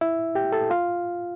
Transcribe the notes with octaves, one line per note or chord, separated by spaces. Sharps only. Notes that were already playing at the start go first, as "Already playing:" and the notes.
E4 E5
G4 G5
A4 A5
F4 F5